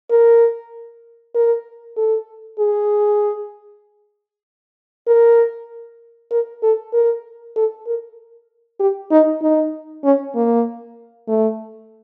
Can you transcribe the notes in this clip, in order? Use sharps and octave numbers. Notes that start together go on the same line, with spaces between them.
A#4
A#4
A4
G#4
A#4
A#4
A4
A#4
A4
A#4
G4
D#4
D#4
C#4
A#3
A3